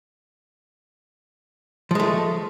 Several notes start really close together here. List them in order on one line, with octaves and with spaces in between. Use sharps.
F3 G#3 A3